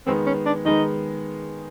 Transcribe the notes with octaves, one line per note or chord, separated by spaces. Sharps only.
D#3 G#3 B3 C4
C#4
D4
D#3 G#3 B3 D#4